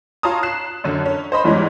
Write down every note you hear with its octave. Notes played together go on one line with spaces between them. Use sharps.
F4 C#5 A5 A#5 D#6
F#6 C7 E7
F#2 D3
C#4
C5 D#5 B5
E2 G#2 E3 G3 C#4 D#4